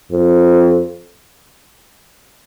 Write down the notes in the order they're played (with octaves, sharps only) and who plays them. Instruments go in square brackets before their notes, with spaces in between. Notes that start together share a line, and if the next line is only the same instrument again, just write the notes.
[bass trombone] F2